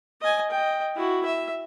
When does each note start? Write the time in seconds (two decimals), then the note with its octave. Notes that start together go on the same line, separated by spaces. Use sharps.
0.21 D#5 G#5
0.51 D#5 G5
0.96 E4 F#4
1.25 E5